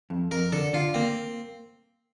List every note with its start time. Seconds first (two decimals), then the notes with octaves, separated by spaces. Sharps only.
0.10 F2
0.31 F2 A#4
0.52 D3 A4
0.73 D3 F4
0.94 A#3 C4